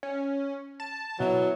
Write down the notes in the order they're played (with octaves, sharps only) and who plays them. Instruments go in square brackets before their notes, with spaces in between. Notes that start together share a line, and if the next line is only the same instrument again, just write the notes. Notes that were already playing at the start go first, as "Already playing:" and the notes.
[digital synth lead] C#4
A5
[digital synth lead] B2 [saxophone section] E3 F#3